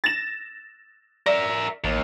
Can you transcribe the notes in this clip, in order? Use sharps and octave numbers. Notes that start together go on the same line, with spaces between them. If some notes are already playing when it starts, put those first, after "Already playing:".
A6 A#6 E7
A#4 D5 E5
A1 D#2